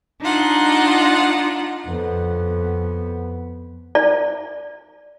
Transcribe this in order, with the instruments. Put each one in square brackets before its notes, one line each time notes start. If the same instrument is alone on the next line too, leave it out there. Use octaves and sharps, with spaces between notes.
[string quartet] D4 D#4 F4 F#5
[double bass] F2 B3
[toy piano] D5